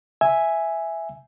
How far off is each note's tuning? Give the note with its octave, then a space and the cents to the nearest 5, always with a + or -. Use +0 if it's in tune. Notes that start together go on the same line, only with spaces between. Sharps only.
E5 +0 G#5 +0